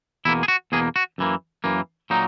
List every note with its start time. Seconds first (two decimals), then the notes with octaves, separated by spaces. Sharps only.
0.25 E2 B2 A#3 E4
0.43 G#4
0.48 F#4
0.72 E2 B2 A#3 G#4
0.96 F#4
1.18 F#2 E3 A#3
1.64 F#2 E3 A#3
2.10 A#2 F#3 A#3 D#4